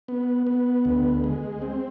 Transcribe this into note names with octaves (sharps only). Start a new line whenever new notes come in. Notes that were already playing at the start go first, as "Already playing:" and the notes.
B3
B3
D2
G#3
C4